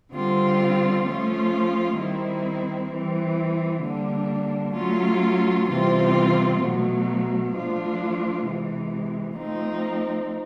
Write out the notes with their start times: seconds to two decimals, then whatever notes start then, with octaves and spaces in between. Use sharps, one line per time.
0.12 D3 G3 C4 F4
1.05 F3 A3 C#4 F4
1.97 D#3 G3 C4 E4
2.90 E3 G3 C4
3.82 D3 G3 A#3 D4
4.74 F#3 A3 C#4 F4
5.68 C3 E3 G3 C4 F4
6.60 B2 F#3 A3
7.53 F3 A3 D4 F4
8.45 C3 E3 G#3
9.37 F3 A3 C4 D#4